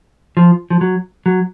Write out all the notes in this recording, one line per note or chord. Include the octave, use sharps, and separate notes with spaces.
F3
F3
F#3
F#3